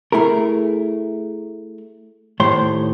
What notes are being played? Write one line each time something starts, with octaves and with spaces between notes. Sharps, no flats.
A3 E4 G#4 A#4
D#2 A2 C5 C6